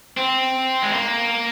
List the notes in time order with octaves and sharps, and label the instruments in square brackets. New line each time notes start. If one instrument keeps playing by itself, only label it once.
[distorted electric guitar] C4
G#3
A#3